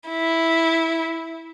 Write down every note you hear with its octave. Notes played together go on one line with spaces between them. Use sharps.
E4